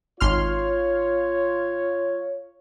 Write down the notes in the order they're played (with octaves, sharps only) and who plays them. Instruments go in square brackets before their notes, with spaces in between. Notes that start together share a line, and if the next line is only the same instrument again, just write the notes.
[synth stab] G#1 C6 F6 [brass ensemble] F4 C#5